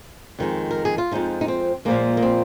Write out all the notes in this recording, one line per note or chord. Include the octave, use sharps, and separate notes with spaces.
F2 D#3 G#3
A#4
G#4
F4
F2 F3 G#3 D#4
D#4
C4
A#2 F3 G#3 A#3
A#3
C4